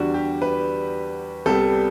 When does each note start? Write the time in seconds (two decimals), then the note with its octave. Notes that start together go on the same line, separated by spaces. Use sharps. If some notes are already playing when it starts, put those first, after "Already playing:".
Already playing: E2 D3 G3 D4 F#4
0.14 G4
0.42 B4
1.46 C2 C3 G3 B3 A4